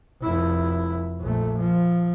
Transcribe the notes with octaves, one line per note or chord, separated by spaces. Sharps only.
F1 E4
A#1 A3
F3